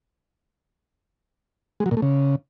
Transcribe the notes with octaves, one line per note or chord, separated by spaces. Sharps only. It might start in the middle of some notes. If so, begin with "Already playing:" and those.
G#3
F#3
A#2
A3
C#3